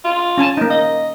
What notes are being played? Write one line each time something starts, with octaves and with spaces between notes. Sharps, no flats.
F4
C#4 G#5 A5
A#3 D#4
D#5